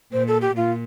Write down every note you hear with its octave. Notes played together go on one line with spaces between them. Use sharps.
A#2 C5
A4
G4
A#2 F4